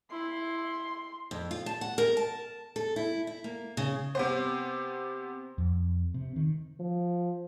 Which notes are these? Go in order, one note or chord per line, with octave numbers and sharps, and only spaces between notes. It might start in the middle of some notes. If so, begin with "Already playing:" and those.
E4 C6
F2
F4
A5
F#5
A#4
A5
A4
E4
E4
A#3
C#3
C3 B3 C5
F2
C3
D#3
F3